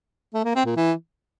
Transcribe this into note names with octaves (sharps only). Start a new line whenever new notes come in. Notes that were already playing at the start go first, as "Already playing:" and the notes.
A3
A#3
C4
A#2
E3